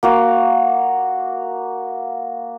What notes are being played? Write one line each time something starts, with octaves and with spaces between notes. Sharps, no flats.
A#3 F#4 F5